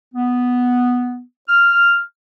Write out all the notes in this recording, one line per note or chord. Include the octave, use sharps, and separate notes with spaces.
B3
F6